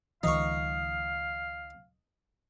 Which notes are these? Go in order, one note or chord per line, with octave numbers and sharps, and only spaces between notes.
C#2 D#3 F3 D#4 F5 C#6